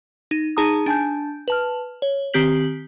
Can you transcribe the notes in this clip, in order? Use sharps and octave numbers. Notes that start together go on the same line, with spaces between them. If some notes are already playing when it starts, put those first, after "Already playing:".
D#4
D#4 G#4 A5 A#5 D#6
D4 G#5 A5 G6
B4 A5 F6
C#5
D#3 C4 G4 G6 B6 F#7